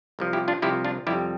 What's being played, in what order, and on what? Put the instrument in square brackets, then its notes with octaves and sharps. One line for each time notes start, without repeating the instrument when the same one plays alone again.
[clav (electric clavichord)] C2 C3 F3
E4 G4
D4 F4
C2 C3 F3 E4 G4
D4 F4
F2 C3 G3 E4 G4